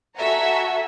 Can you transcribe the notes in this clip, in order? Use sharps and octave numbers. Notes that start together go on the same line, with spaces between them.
F#4 A4 E5 F#5 G#5 A#5